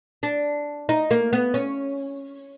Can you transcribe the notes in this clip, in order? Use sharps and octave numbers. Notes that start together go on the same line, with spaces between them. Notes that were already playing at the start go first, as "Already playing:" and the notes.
D4
D#4
A#3
B3
C#4